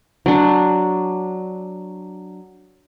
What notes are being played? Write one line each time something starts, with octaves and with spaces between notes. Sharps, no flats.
F#3 D4